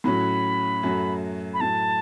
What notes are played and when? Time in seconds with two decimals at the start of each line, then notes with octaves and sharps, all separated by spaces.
0.04 A2 F#3 C#4 F#4 B5
0.83 F#2 F#3 A3 F#4
1.54 B5
1.60 A2 F#3 A3 A5